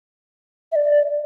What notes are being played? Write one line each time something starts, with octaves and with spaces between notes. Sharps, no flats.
E5
D5